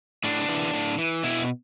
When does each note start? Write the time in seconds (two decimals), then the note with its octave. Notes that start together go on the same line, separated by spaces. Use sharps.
0.24 A2 D4
0.48 E3
0.74 A2
0.98 E3
1.23 B2 E4